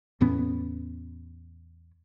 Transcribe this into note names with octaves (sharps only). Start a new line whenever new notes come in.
E2 A2 B3 C#4